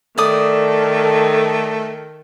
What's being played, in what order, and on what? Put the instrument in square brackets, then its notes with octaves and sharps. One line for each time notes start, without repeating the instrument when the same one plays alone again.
[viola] D#3 [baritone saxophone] A3 [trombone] A4 [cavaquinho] D5 D#6